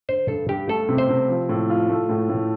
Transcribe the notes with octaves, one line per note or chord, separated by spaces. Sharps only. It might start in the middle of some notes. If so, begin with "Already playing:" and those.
D3 C5
G2 A4
G2 G4
A3 A4
C3
C5
C3
F3
A2
F4
A3
A2
A2